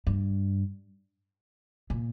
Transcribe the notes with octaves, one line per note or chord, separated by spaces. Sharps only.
G2
A#2